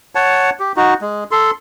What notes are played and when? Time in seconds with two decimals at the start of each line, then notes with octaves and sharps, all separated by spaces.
0.15 C#5 F#5 A5
0.60 G4
0.76 D#4 F#4
1.01 G#3
1.31 A4 C6